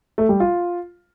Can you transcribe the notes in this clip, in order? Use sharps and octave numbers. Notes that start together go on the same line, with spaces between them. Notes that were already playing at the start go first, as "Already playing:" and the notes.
A3
G3
F4